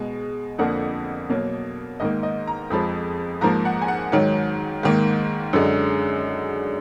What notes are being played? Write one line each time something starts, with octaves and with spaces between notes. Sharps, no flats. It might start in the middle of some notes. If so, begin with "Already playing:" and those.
Already playing: B2 G#3
F2 D3 F3 A#3 F#5
B2 F#3 A#3
G#2 D#3 A#3 D#5
D#5
A#5
F2 F3 G#3 B5
G#2 F3 A#3 A#5
F#5
G#5
F#5
G#2 D#3 F#3
G#2 D#3 A#3
F#2 D3 G#3